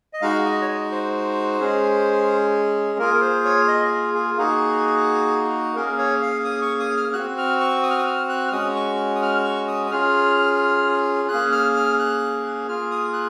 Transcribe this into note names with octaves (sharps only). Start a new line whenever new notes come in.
D#5
G#3 D#4 F#4 F5
D#5
C#5
D#5
C5
G#3 C#4 G#4
A#3 F4 G#4 A#4
A#4
C5
C#5
D#5
G#4
A#3 D#4 F#4 G#4
A#3 C#4 G#4 A#4
C#5
F5
D#6
C#6
D#6
F6
C4 F#4 F#6
F6
C#6
D#6
F6
D#6
F6
F#6
F6
G#3 C#4 F#4 D#6
C#6
D#6
F6
C#6
D#6
D#6
C#4 F4 G#4 F6
A#3 C#4 G#4 F#6
F6
F6
F#6
A#3 F4 G#4 F6
D#6
F#6